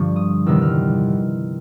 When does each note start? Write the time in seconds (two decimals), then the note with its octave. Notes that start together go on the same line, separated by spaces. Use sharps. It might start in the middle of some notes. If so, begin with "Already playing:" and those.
Already playing: G2 D3 F3 C#6
0.16 D#6
0.46 E2 C3 D#3 G3 E6
0.62 F6